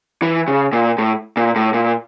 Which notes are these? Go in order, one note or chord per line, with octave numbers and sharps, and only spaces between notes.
E3
C#3
A#2
A2
A#2
A2
A#2